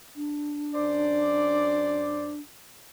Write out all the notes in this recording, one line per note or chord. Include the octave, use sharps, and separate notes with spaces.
D4
F#2 C5 D5